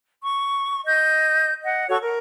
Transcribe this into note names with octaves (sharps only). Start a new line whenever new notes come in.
C#6
D#5 G6
D#5 F#5
F#4 A4 C#5 C#6
A#4